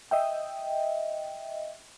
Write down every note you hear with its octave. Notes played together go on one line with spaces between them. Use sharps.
D#5 E5 G5